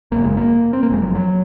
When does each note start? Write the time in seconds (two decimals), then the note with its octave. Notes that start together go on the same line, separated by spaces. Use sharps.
0.11 G#1 F#2 C#3 A#3
0.24 G#3
0.37 A#3
0.73 C4
0.83 A#3
0.89 F#1 F2 C3 G#3
1.02 F#3
1.15 F#3